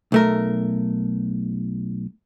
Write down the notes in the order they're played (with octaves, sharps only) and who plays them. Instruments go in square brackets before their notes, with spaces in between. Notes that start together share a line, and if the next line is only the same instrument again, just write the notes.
[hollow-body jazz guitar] B1 A3 A#4